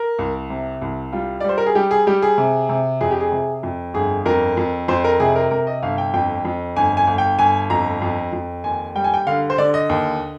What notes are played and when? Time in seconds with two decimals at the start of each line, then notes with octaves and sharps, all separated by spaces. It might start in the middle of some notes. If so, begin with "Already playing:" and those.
Already playing: A#4
0.19 C2
0.50 C3
0.82 C2
1.13 G3 F4
1.40 D5
1.44 G3 C5
1.58 A#4
1.66 G#4
1.75 G3 G4
1.91 G#4
2.07 G3 G4
2.22 G#4
2.38 C3
2.69 C3
3.01 F2 G#4
3.11 G4
3.20 G#4
3.32 C3
3.63 F2
3.94 G1 G#4
4.26 F2 A#4
4.57 F2
4.88 F2 C5
5.04 A#4
5.20 C3 G#4
5.36 A#4
5.51 C3 A#4
5.67 D#5
5.83 G1 F5
5.98 G5
6.14 F2 G5
6.45 F2
6.76 G1 G#5
6.97 G#5
7.07 G1
7.18 G5
7.39 G1 G#5
7.70 F2 A#5
8.02 F2
8.33 F2
8.64 D#2 G#5
8.95 G3 G5
9.04 G#5
9.14 G5
9.27 D3 F5
9.50 C5
9.58 D3 D5
9.74 D#5
9.89 D#2